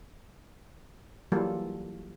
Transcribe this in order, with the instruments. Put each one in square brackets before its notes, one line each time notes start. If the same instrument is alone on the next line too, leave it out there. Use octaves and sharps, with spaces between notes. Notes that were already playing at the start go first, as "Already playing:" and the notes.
[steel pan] E3 F#3 G3 A#3 F4 A4